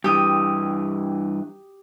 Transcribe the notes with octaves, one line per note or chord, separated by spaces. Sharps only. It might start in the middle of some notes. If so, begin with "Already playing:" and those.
G2 E3 G4 D#6